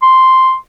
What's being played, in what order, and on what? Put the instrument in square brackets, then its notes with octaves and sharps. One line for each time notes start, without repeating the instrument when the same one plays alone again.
[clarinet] C6